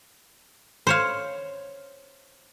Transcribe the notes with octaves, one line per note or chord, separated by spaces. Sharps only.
C5 C#5 F5